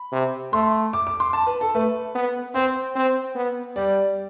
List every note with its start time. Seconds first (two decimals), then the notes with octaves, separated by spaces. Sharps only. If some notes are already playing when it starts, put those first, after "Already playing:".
Already playing: B5
0.12 C3
0.53 A3 C6
0.93 D6
1.07 D6
1.20 C6
1.33 A5
1.47 B4
1.61 A4
1.74 A3 B4
2.15 B3
2.54 C4 C5
2.96 C4
3.35 B3
3.76 G3 D5